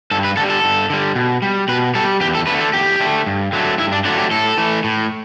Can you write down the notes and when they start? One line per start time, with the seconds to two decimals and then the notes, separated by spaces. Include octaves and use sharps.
0.11 G2 A4
0.24 B4
0.37 D3 G3 A4
0.50 A4
0.64 G2
0.90 D3 G3
1.15 B2
1.42 G3
1.68 B2 B4
1.95 G3 A4
2.21 E2 G4
2.35 A4
2.47 D3 A3 B4
2.61 A4
2.73 E2 G4
3.00 D3 A3
3.26 G2
3.53 D3 F#3 A3
3.78 G2 E4
3.92 D4
4.05 D3 F#3 A3 D4
4.18 G4
4.31 A2 A4
4.57 E3 A3
4.84 A2